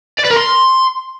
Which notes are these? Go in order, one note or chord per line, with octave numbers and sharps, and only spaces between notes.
D5
B4
A#4
C6